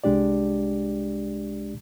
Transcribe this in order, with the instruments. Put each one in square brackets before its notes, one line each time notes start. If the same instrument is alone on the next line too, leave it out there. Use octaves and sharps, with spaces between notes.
[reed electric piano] C2 G#3 D4 G4 D5